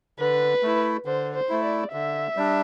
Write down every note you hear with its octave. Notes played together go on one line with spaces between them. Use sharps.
D3 B4
A3 E4
D3 C5
C5
A3 E4
D5
D3 E5
G3 D4